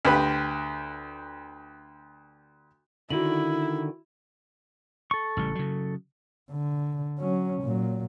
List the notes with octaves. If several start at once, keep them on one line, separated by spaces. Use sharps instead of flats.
D2 G4 B4 B5
D3 D#3 E4 F#4 F#7
A4 C#6
A1 C#3 G3
C#3 F#3
D3
F#3 C#4
A#2 F#3